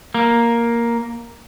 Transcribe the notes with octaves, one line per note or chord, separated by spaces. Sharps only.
A#3